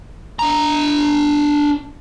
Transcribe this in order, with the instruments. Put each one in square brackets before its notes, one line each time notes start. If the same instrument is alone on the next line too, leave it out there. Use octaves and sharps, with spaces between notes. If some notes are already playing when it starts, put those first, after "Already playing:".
[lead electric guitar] D4 A#5